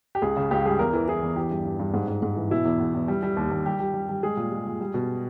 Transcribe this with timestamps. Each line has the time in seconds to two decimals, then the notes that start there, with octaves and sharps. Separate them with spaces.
0.15 G4
0.22 C#2 G#4
0.37 C#3
0.51 C#2 G4
0.65 G3 G#4
0.79 E2 A#4
0.93 E3
1.08 E3 G#4
1.22 E2
1.36 E3 G4
1.51 G2
1.65 G2
1.79 G2
1.94 G#2
2.08 G#2
2.22 G#2
2.36 E3
2.51 B2 E4
2.65 E2
2.80 E2
2.94 E2
3.08 G3
3.23 G3
3.37 D#2
3.51 D#2
3.66 G3 G4
3.80 G3
3.94 G3
4.09 G3
4.23 G#3 G#4
4.37 A#2
4.52 G#3
4.67 A#2
4.80 G3
4.94 B2